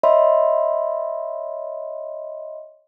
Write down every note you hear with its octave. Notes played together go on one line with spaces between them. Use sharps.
C#5 D#5 E5 B5 C6